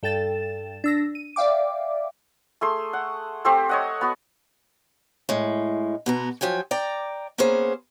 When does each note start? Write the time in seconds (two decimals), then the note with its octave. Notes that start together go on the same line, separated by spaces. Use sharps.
0.03 G2 A4 G5 A6 E7
0.84 D4 E6 A#6
1.15 D#7
1.36 D5 E5 F5 G5 D6
2.61 A3 G#4 C6
2.93 F#5
3.45 A3 C4 G4 C5
3.69 C#5 D#5 F#5
4.01 B3 F#4
5.29 A2 G#3
6.06 B2 B3 A#5
6.41 F3 F#3 G5 G#5
6.71 D5 G5 A#5
7.38 A#3 B3 C#4 G#4 C5